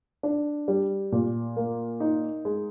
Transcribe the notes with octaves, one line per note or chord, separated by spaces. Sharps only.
D4
G3
A#2
A#3
D#4
G#3